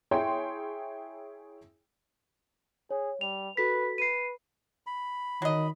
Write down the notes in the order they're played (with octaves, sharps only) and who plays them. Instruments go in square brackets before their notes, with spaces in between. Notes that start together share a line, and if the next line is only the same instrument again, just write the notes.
[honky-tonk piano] E4 G#4 C#5 G5 C6
[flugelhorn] G#4 [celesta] C#5
[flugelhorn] G3 [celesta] F7
[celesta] F#4 A4 B6 [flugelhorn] B4
[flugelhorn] B4 [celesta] C7 D#7
[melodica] B5
[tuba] D#3 [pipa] F#3 D#5